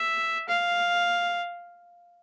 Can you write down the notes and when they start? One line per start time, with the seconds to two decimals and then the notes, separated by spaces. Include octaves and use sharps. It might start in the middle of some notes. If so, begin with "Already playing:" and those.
Already playing: E5
0.48 F5